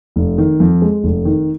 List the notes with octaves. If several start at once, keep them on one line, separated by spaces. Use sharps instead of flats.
F1
D#3
F2
G#3
F1
D#3